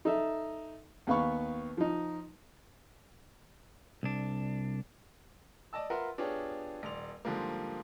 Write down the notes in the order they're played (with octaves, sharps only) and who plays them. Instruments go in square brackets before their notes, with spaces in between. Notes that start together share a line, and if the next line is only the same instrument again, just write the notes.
[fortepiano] D#4 A4 E5
D#2 B3 F5 B5 C#6
F3 D#4
[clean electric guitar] C2 D4
[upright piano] D5 D#5 A5 E6
F4 A#4 B4 E5 F#5 C6
B3 D4 F4 G4 G#4 C#5
D#1 D5 C6 F7
G#2 D3 F3 G3 A#3